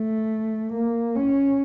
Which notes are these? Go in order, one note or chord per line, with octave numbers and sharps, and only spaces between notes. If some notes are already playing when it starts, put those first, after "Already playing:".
Already playing: A3
A#3
C#4